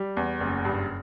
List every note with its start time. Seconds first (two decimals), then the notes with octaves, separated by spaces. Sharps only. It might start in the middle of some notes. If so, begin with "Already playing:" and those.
Already playing: G3
0.17 E2
0.40 F#1
0.65 G2